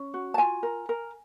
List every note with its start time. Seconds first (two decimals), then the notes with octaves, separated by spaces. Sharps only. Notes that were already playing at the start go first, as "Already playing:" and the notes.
Already playing: C#4
0.14 F#4
0.34 A5
0.38 F4 G#5
0.63 A#4
0.89 A#4